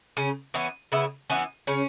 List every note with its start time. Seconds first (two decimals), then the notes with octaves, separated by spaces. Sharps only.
0.17 C#3 C#4
0.54 E3 B3 C#4
0.92 C#3 B3 E4
1.30 E3 B3 C#4 F#4
1.67 C#3 C#4